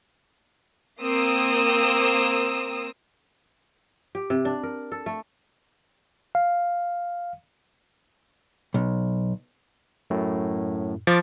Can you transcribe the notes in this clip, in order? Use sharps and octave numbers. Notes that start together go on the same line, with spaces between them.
A#3 C4 D#6 E6
G4
C3
D4
A#4
A4
A3
F5
B1
F#2 A2
F3 D6 A6